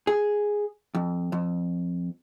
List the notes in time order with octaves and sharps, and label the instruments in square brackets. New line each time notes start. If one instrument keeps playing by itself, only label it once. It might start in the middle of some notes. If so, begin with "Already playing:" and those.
[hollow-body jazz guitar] G#4
F2
F2